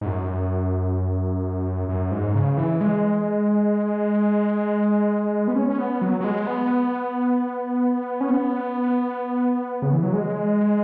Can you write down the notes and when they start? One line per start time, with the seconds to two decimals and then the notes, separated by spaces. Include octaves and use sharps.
0.01 G#2
0.06 F#2
1.89 F#2
2.11 G#2
2.35 C#3
2.57 E3
2.81 G#3
5.48 B3
5.56 C#4
5.70 C#4
5.78 B3
6.02 F#3
6.21 F#3
6.24 G#3
6.47 B3
8.21 C#4
8.31 B3
9.82 C#3
9.93 E3
10.03 F#3
10.13 G#3